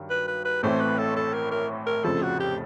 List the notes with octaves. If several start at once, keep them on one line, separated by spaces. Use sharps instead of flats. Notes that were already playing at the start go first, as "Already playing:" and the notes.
Already playing: G2 D#3 F#3
B4
B4
B4
A1 A2 E3 A3 C4 C5
B4
A4
A4
A#4
A#4
A#4
F1 F2 C#3 F3 A4
F#4
G4